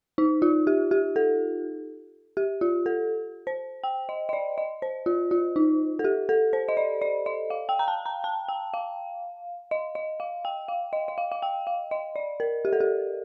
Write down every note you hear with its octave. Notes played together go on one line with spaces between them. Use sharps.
D#4
F4
G4
G4
A4
G4
F4
A4
C5
G5
D#5
D#5
D5
D#5
C5
F4
F4
D#4
A4
G4
A4
C5
D#5
D5
D5
D#5
F5
G5
A#5
A5
A#5
A5
G5
F5
D#5
D#5
F5
G5
F5
D#5
D#5
F5
F5
G5
F5
D#5
D5
A#4
G4
A4
G4